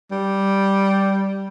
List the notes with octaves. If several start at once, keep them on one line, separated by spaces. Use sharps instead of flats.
G3